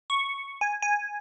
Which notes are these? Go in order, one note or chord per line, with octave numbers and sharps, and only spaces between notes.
C#6
G#5
G#5